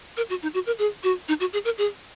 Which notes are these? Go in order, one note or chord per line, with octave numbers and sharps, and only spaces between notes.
A#4
F#4
D#4
F#4
A#4
G#4
F#4
D#4
F#4
G#4
A#4
G#4